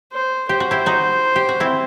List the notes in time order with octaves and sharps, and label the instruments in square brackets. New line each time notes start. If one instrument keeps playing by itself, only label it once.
[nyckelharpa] C5
[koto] G4 [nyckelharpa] C5
[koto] F#4
E4 G4
D#4 F#4
G4
F#4
C4 E4